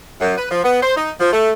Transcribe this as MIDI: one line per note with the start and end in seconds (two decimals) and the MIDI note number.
0.20 0.36 42
0.38 0.51 71
0.51 0.64 53
0.64 0.80 59
0.82 0.96 72
0.96 1.11 63
1.20 1.31 53
1.33 1.52 57